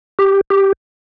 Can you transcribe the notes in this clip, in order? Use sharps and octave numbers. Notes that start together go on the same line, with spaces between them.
G4
G4